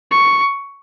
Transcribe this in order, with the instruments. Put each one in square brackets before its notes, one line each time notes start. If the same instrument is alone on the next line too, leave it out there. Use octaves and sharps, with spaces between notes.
[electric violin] C#6